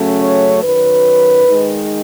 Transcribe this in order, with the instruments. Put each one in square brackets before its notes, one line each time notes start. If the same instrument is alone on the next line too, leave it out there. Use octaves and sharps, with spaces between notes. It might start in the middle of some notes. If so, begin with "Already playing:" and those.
Already playing: [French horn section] C#3 F#3 A3 C#4
C#5
F#2 D#3 F#3 B4
D#3 G#3 D#4